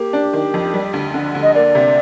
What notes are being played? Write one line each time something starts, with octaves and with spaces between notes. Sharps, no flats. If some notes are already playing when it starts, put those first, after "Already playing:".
Already playing: A#3 G4
D4
D#3
F2
G3
D2
D3
D2
D#5
A#3 D5
C3